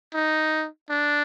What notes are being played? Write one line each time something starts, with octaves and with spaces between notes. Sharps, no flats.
D#4
D4